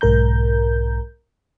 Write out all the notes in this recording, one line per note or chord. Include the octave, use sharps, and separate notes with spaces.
B1 G#2 A#4 A#5 G6